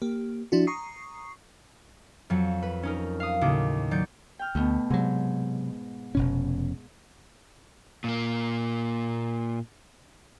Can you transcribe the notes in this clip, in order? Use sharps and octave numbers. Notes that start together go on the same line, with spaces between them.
A#3 G4
F3 D4 E4 F#4
A#5 C#6 D#6 C7
F2 F#3 C#7
B4
C#4 D#4 A#4
F5 D#6
D#2 A2 C#3 F#4 D6
D#3 F#3 D5 G6 C#7
G5 F6
D2 B2 A3
G#2 C3 F#3
F1 B2 C#4
A#2 A#3